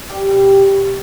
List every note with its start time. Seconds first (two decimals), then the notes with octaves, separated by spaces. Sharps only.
0.09 G3 G4
0.31 B2
0.52 B2
0.74 B2